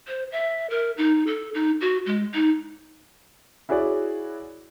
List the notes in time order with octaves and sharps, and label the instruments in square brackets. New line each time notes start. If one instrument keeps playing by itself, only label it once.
[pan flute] C5
E5
A#4
D#4
A4
D#4
F#4
G#3
D#4
[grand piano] E4 F#4 G#4 C#5 D5